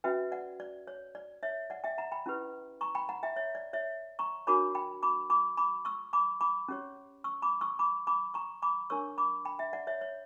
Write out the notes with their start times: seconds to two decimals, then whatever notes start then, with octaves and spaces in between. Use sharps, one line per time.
0.04 C#4 F#4 B4 E5 G5
0.32 D5 F#5
0.60 D5
0.87 C#5
1.15 D5
1.43 C#5 E5
1.70 D5 F#5
1.84 E5 G5
1.98 F#5 A#5
2.12 G5 B5
2.26 C#4 E4 G4 B4
2.81 A#5 C#6
2.95 G5 B5
3.09 F#5 A#5
3.23 E5 G5
3.36 C#5 E5
3.55 D5
3.73 C#5 E5
4.19 A#5 C#6
4.47 D4 F#4 A#4 C#5 B5 D6
4.75 G5 B5
5.03 B5 D6
5.30 B5 D6
5.57 B5 D6
5.85 C#6 E6
6.13 B5 D6
6.41 B5 D6
6.68 C#4 G4 C#5
7.24 C#6 E6
7.42 B5 D6
7.61 C#6 E6
7.79 B5 D6
8.07 B5 D6
8.34 A#5 C#6
8.62 B5 D6
8.90 D4 A#4 C#5 C#6 E6
9.18 B5 D6
9.45 G5 B5
9.59 E5 G5
9.73 D5 F#5
9.87 C#5 E5
10.01 C#5